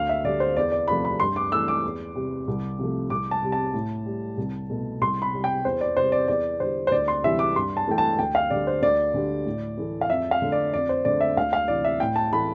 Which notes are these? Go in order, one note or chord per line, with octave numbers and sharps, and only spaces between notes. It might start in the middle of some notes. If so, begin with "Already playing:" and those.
Already playing: D2 F5
E5
D3 G3 D5
C5
E2 D5
D5
C3 F3 A3 B5
B5
G2 C6
D6
E3 A3 E6
D6
E2
C3 G3
C2
C3 F3 A3
C2 D6
A5
C3 G3
A5
A2
G3
C2
B2 A3
C2 C6
B5
C3 G3
G5
E2 C5
D5
C3 G3 C5
D5
E2 D5
D3 G3 C5
C5
D2 D5
C6
C3 E3 G3 E5
D6
G2 C6
A5
E3 A3 G5
A5
D2 G5
F5
D3 G3 D5
C5
D2 D5
D3 G3
A2
E3 A3
F5
F2 E5
F5
D3 A3
D5
F2 D5
C5
D3 A3 D5
E5
D2 F5
F5
C3 E3 D5
E5
A2 G5
A5
E3 A3 B5